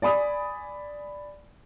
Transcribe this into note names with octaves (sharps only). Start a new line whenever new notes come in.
D5 G#5 B5 D#6